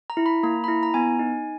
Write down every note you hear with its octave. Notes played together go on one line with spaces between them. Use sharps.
A#5
E4
B5
A#3 A#5
B5
E4 A#5
A#5
B3 G#5
D#4